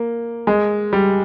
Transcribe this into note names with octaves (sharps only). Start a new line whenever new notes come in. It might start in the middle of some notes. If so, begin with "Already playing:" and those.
Already playing: A#3
G#3
G3